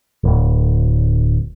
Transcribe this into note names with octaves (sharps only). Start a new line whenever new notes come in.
D1